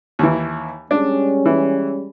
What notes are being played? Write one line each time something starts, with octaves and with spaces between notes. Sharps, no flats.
D#2 E3
G3 G#3 C#4 D4
E3